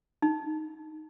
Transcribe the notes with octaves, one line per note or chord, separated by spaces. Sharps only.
D#4